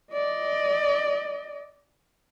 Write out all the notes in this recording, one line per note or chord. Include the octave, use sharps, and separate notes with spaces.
D5 D#5